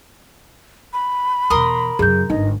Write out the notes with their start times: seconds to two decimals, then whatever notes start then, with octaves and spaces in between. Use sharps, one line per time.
0.93 B5
1.50 E2 B2 A#4 C6 D#6
1.99 F#2 C#3 G#4 G6
2.30 G1 G#2 D#4 D#5